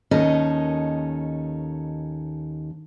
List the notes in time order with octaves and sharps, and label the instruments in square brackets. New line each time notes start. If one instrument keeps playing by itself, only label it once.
[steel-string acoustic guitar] D#2 D#3 C#4 A4 D#5